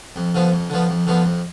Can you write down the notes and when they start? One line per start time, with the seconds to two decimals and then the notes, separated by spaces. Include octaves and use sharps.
0.16 F2
0.34 D3 F3 B3
0.52 F2
0.70 D3 F3 B3
0.89 F2
1.07 D3 F3 B3
1.25 F2